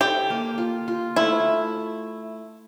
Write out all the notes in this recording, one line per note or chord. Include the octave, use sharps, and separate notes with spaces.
G4 A4
A#3
F4
F4
A3 E4